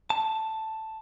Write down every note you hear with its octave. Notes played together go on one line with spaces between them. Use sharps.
A5